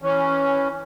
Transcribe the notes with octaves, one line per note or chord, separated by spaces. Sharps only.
E3 C#4